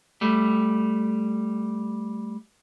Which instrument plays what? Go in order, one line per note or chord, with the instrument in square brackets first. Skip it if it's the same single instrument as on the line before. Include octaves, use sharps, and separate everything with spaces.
[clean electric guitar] G3 A3